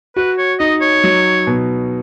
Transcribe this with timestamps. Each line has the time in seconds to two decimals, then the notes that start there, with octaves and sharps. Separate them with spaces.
0.16 F#4 B4
0.38 C#5
0.60 D#4 D#5
0.81 C#5
1.04 F#3
1.47 B2